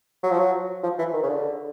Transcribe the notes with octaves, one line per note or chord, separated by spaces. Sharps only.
F#3
F3
F#3
F3
E3
D#3
C#3
D3